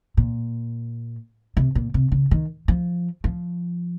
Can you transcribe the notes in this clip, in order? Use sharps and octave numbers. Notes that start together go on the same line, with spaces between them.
A#2
C3
A#2
C3
C#3
D#3
F3
F3